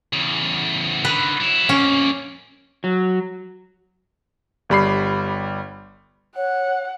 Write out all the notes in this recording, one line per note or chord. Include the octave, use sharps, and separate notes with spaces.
E2 C#3
D3 D#3 B4
F#3 E4
F2 A#3 C#4
F#3
G1 G3 B5 C7
C#5 F#5